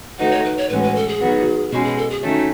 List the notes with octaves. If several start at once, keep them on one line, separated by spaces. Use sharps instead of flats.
D#3 A3 D#4 F#4 B4
C#5
B4
C#5
A2 E3 G#3 C#4 F#4 B4
B4
A4
G#4
D#3 F#3 B3 F#4
B2 G#3 C#4 F#4
G#4
A4
G#4
D#3 A3 C#4 F#4